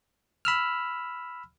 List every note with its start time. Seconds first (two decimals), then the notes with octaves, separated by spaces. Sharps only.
0.45 B5 E6 F6